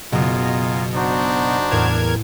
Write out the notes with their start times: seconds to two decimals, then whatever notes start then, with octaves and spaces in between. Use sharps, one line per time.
0.13 F#1 B2 F4 D#5 G#5 A#5
0.95 D4 D#4 F#4 C5
1.71 E2 A2 A#4 G#6 E7